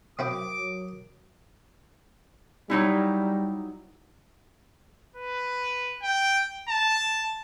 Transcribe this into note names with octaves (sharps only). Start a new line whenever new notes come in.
F#3 C4 E4 A#4 G5 D6 D#6
F#3
F#3 G3 D#4 E4
B4
G5
A5